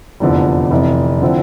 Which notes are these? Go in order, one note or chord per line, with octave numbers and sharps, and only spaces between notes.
F1 E2 D3 F3
F1 F2 E3
D3 F3 C4 E4